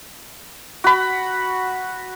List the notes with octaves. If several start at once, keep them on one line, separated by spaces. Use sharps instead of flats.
F#4 B5